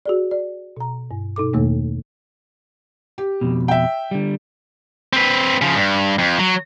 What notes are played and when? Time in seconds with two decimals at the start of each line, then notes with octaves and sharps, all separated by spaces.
0.06 F#4 G#4 D5
0.31 D5
0.77 B2 A#5
1.11 G2
1.36 B2 D#4 A4 D6
1.53 E2 B2 D#3 A3 A#3 D#4
3.18 G4
3.41 F2 B2
3.68 E5 G5
4.11 D3 G3
5.13 C4 B4
5.62 C#3 F3
5.76 G2
6.19 F2
6.39 F#3